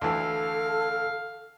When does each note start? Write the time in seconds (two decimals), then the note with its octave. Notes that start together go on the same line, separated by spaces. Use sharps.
0.01 D2 E3 A4 F5